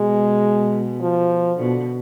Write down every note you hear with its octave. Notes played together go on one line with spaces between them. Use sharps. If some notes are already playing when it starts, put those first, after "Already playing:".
Already playing: B2 G#3
F3
B2 D3